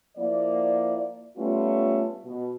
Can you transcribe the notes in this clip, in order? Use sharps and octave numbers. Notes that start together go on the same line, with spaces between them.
F3 A#3 E4 D5
G3 A3 B3 C#4 F4
B2